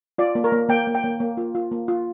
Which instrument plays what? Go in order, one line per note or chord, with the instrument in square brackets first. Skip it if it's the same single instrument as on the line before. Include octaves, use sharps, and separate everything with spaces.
[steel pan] F4 D5
A#3
A#4
A#3
A#3 G5
A#3
G5
A#3
A#3
F4
F4
A#3
F4